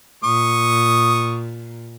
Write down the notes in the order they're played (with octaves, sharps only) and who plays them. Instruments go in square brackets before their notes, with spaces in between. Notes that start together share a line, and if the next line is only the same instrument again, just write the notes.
[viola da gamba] A#2 [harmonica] C#6 D#6